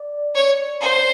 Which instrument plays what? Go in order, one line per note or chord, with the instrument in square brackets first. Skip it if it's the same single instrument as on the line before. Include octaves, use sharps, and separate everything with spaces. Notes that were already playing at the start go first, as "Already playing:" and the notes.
Already playing: [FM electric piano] D5
[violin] C#5
C5